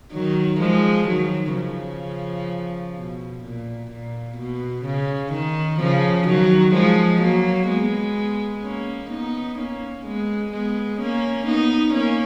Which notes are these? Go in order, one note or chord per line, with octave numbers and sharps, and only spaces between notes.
D#3 F#3
F3 G#3
D#3 F#3
C#3 F3
B2
A#2
A#2
B2
C#3
D#3
C#3 F3
D#3 F#3
F3 G#3
F#3 A#3
G#3 B3
A#3 C#4
B3 D#4
A#3 C#4
G#3 B3
G#3 B3
A#3 C#4
B3 D#4
A#3 C#4